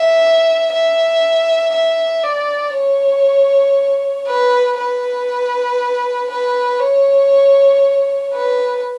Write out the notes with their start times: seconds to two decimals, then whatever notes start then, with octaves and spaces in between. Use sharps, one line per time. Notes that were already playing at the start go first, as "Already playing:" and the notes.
Already playing: E5
0.72 E5
1.74 E5
2.24 D5
2.75 C#5
4.27 B4
4.78 B4
6.31 B4
6.80 C#5
8.33 B4